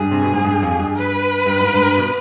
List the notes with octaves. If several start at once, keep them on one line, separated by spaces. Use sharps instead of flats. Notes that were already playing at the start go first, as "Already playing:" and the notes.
Already playing: G2 G#4
C3
B2
G#2
G2
F2
G2
B4
G2
G#2
G2
B2